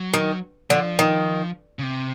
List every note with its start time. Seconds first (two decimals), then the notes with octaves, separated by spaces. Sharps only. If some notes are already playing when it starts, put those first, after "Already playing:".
Already playing: F#3
0.14 D#3
0.70 D3 F3
0.99 D#3
1.79 C#3
1.83 C3